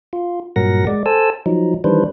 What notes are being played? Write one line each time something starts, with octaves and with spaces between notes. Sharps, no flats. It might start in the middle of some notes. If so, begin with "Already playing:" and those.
F4
G2 A#2 F#3 A#4 F#5 A#6
G#3 D5
A4 C5 G#5 A5 E6
F3 F#3 D#4
D#3 E3 G3 D4 B4 C5